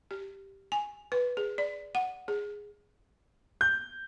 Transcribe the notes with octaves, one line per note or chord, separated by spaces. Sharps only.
G4
G#5
B4
G#4
D5
F#5
G#4
G6